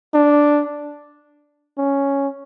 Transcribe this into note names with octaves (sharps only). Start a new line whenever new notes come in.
D4
C#4